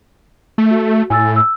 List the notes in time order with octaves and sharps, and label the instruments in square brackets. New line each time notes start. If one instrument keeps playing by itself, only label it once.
[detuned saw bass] A3
[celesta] F#4
[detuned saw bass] A2 [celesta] G#5 E6 A6
[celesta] E6